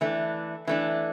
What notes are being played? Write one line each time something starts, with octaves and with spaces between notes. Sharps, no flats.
E3 A3 D4
E3 A3 D4